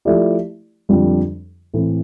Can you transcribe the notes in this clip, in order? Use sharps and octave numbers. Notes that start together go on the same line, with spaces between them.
F3 A3 E4 G4 D5
F2 D3 G3 D4 F4
A2 E3 A3 C4